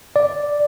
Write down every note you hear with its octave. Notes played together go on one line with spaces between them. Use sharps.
D5